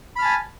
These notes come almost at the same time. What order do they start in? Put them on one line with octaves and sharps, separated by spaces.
B5 F6 A5 G#5